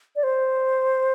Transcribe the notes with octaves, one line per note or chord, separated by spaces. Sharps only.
D5
C5